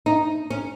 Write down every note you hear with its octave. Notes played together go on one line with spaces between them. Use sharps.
D#4
C#4